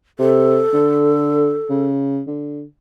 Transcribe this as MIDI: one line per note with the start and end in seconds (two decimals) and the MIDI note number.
0.19 0.61 48
0.19 1.85 69
0.73 1.56 50
1.70 2.21 49
2.27 2.63 50